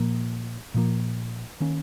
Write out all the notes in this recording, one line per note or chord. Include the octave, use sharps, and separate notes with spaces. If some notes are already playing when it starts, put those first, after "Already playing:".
Already playing: A#2 F3 A#3
A#2 F3 A#3
D#3 A#3 C#4